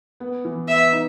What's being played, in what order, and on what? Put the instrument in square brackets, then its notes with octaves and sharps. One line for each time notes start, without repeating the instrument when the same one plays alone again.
[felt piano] B3
E3
[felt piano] B3 [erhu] E5
[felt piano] D#4